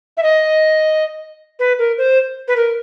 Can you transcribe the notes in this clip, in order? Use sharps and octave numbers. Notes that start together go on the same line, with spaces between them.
E5
D#5
B4
A#4
C5
B4
A#4